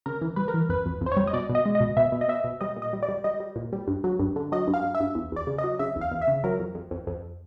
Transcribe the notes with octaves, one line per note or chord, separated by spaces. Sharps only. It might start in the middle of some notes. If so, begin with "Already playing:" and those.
C#3 A#4
E3
G3 B4
A#4
E3
F2 B4
F2
F2
C5
G3 C#5
D#5
B2 D5
B2
D#5
G#3
D#5
B2
B2 E5
B2
D#5
B2 E5
B2
G3 D#5
A#2
D#5
G3
D5
G3
G3 D#5
G3
A#2
G3
G2
F#3
G2
D3
F#3 D#5
G2
F5
G2
E5
G2
E2
E2 D5
C#3
D#5
F#3
C#3 E5
E2
F5
E2
E5
C#3
F#3 A#4
F2
F2
F2
F2